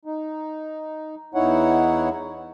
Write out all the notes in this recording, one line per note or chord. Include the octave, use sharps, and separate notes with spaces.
D#4
E2 D#4 E4 C#5 F#5